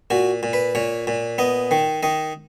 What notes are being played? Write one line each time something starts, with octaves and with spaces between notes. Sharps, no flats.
A#2 F#4
A#2
B4
A#2 C#5
A#2
B3 D#5
D#3
D#3 D#5